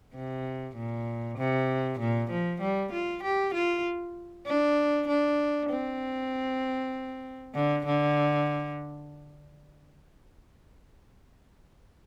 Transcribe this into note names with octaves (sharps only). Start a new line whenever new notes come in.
C3
A#2
C3
A#2
F3
G3
F4
G4
F4
D4
D4
C4
D3
D3